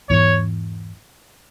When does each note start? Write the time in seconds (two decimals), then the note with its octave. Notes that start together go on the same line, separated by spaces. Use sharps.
0.09 E2 G#2 C#5